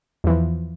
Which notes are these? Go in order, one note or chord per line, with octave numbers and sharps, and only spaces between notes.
E2 E3 F3